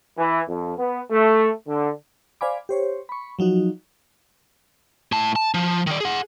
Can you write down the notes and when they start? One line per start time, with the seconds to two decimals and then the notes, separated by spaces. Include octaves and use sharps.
0.17 E3
0.49 F2
0.78 B3
1.11 A3
1.67 D3
2.41 C5 D5 F5 G#5 B5 D6
2.69 G4 C5 C#5
3.09 B5 C#6
3.39 F3 F#3 D#4 F#4
5.12 A2 A5
5.36 A5
5.54 F3
5.87 D#3 D5
6.00 G#4 F#5